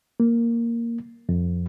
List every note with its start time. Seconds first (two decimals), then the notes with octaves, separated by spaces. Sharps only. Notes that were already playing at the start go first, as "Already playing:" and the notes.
0.20 A#3
1.29 F2